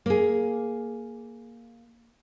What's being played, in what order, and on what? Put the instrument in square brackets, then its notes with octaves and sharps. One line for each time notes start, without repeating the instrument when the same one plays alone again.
[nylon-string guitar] A#3 G#4